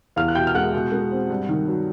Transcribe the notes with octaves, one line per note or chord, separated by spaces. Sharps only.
E2 F5 F6
F#6
B2 G5 G6
F6
G#3 F#5 F#6
B2
G#3
C4
G2
D#3
F#3